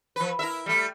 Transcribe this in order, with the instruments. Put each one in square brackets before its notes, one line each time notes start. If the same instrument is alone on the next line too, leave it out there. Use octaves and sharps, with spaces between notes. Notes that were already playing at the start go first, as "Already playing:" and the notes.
[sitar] F3 B4
E4 A#4 E5
G3 A3